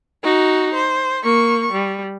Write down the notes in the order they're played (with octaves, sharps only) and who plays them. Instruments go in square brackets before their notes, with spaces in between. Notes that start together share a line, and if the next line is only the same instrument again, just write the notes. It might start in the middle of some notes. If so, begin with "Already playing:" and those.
[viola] D#4 F#4
C5
A#3 C#6
G3